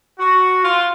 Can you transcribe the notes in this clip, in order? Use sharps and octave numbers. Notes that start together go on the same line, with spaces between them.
F#4
F4